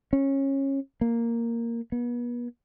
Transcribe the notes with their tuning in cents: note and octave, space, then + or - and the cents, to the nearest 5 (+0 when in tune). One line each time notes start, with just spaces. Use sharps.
C#4 -20
A#3 -5
B3 -40